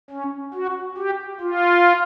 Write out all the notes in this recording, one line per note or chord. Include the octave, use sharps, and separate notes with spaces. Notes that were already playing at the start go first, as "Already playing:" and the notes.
C#4
F#4
G4
F4